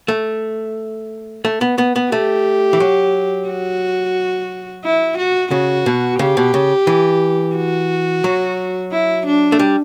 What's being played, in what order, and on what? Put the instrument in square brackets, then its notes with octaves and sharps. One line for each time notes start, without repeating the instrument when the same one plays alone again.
[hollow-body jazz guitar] A3
A3
B3
B3
B3
[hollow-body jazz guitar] A3 [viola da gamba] G4
[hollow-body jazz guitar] E3
F#3
[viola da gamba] F#4
E4
F#4
[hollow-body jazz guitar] C#3 [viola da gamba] F#4
[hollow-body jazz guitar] B2
[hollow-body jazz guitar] C#3 [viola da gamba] G4
[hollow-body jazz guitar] B2
C#3
E3
[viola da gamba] F#4
[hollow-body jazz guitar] F#3
[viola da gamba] E4
D4
[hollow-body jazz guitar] A3
G3